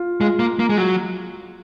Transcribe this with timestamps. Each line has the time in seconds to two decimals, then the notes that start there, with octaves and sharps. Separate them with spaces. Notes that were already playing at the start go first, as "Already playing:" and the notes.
Already playing: F4
0.20 G#3 F4
0.39 A#3
0.59 A#3
0.69 G#3
0.78 F#3